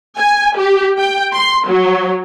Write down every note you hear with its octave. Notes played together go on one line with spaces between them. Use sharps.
G#5
G4
G5
C6
F#3